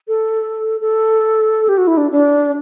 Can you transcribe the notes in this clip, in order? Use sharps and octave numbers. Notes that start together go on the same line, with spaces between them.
A4
A4
G4
F#4
E4
D4
D4